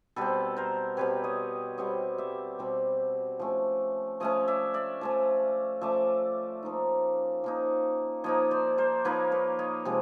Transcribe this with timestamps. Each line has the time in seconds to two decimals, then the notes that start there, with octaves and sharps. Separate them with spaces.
0.16 B2 G3 C4 A4 B4
0.57 A#4 C5
0.97 B2 G3 C4 B4 C#5
1.24 C#5 D#5
1.78 B2 G3 C4 C#5 D#5
2.18 D5 E5
2.59 B2 G3 C4
3.39 F3 A3 C#4
4.20 F3 A3 C#4 C#5 D#5
4.48 D5 E5
4.74 D5 E5
5.01 F3 A3 C#4
5.81 F3 A3 C#4 D5 E5
6.63 F3 A#3 D#4
7.44 F3 A#3 D#4
8.24 F3 A#3 D#4 C#5 D#5
8.51 C5 D5
8.78 A#4 C5
9.05 F3 A#3 D#4 B4 C#5
9.32 B4 C#5
9.59 C#5 D#5
9.85 C3 F3 G#3